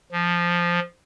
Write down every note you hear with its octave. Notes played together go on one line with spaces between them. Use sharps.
F3